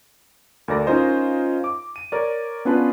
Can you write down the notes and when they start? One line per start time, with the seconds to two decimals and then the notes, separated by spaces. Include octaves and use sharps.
0.68 D2 A#4 D5 A#6
0.87 C#4 D#4 F4 A#4 C5 D#5
1.64 D6
1.96 D#7
2.12 A#4 C#5 D5
2.65 B3 C#4 D4 F4 B4